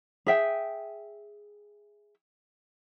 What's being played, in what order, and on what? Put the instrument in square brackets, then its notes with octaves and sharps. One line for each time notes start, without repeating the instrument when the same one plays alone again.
[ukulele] G#4 E5 G5